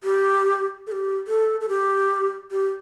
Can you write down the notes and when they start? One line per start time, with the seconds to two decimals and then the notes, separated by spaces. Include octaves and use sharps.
0.04 G4
0.87 A4
0.92 G4
1.27 A4
1.61 A4
1.69 G4
2.51 G4